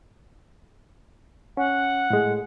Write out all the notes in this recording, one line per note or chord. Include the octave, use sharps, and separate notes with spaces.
C#4 F#5
A2 G#3